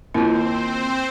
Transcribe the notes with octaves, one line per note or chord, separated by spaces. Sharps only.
D#2 C4 E4 F4 C5